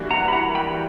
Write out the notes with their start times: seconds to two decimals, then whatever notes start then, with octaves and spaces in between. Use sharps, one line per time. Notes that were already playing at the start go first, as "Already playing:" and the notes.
Already playing: E3 G3 A#3 D4 F#4
0.11 F#5 A#5
0.28 B5
0.33 F#5 A#5
0.55 G5 B5